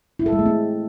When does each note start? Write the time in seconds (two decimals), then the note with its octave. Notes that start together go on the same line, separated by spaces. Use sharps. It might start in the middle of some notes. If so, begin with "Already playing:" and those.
0.19 E4
0.26 A4
0.33 G#3
0.39 A3
0.46 C4